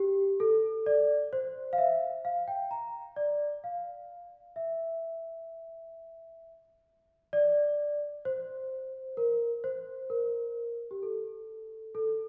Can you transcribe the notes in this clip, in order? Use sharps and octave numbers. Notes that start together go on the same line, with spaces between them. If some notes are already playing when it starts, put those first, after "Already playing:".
Already playing: G4
A4
D5
C5
F5
E5
F5
G5
A#5
D5
F5
E5
D5
C5
A#4
C5
A#4
G4
A4
A4